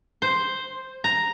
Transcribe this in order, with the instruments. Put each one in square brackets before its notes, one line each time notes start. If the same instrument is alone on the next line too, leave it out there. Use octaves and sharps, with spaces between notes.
[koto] C5
A#5